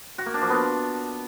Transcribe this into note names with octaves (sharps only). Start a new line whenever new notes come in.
F#4
A#3
D4
F3
B3